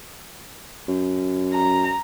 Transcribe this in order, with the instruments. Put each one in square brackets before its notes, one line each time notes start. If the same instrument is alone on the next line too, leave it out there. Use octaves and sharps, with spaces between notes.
[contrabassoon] F#2
[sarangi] A#5